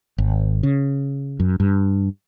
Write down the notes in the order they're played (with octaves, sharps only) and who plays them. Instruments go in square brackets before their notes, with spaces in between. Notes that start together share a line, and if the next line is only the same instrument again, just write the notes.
[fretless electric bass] G#1
C#3
F#2
G2